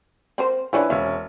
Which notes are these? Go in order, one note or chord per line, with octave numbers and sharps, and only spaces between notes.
C4 A#4 C5
F3 C#4 D4 E4 B4
E1 C4 C#4 E5 F5